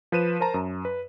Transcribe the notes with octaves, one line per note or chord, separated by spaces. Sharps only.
F3 B4 D#7 E7
A#4 C5 A5 A#5
F#2
B4